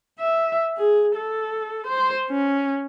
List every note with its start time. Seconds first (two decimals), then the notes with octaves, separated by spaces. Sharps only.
0.19 E5
0.77 G#4
1.15 A4
1.87 C5
2.30 C#4